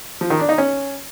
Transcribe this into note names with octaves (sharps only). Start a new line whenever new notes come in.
F3
D#3
D4
D#4
C#4